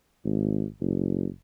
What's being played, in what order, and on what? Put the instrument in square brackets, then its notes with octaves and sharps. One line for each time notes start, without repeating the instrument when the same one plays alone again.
[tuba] G#1
F#1